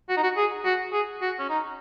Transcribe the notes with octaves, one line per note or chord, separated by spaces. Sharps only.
F#4
D#4
F#4
G#4
F#4
G#4
F#4
C#4
D#4